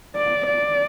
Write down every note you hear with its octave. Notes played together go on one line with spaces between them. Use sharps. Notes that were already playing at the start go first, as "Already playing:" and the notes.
D5
D5